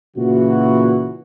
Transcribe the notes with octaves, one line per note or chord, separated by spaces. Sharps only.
A#2 C#3 E3 F#4